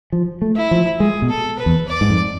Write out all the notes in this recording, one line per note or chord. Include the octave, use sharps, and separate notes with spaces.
F3
A3
E4
F3
G#3 G#4
B2
A4
B4
E2
D5
G#2
F2